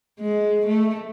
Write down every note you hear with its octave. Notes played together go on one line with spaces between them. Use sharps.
G#3
A3